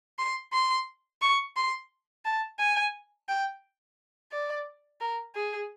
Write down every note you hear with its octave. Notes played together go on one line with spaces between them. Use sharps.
C6
C6
C#6
C6
A5
G#5
G5
D5
A#4
G#4